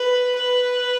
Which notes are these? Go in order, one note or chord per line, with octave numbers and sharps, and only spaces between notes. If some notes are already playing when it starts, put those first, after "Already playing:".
Already playing: B4
B4